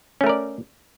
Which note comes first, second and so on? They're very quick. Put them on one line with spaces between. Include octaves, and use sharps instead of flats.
C#4 A3 A#4 D5